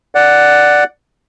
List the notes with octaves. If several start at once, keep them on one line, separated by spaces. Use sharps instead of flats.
D5 F#5